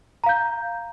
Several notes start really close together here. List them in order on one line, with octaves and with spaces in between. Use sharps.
A#5 F5 G6